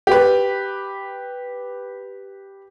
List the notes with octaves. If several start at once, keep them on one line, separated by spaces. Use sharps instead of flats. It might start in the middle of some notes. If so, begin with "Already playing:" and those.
G4 B4